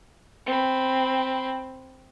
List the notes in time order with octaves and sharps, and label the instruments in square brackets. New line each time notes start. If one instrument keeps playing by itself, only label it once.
[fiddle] C4 B5